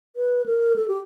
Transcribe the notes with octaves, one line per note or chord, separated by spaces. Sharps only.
B4
A#4
A4
G4